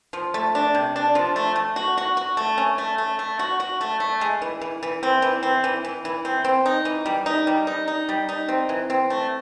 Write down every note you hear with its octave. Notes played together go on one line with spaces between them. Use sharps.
F3
A3
D4
C3
D4
F3
A3
A3
F#4
F#4
F#4
A3
C#4
A3
A3
A3
F#4
F#4
A3
A3
G#3
E3
E3
E3
C4
E3
C4
E3
E3
E3
C4
C4
D#4
E3
G3
D#4
G3
D#4
D#4
G3
D#4
C4
E3
C4
A3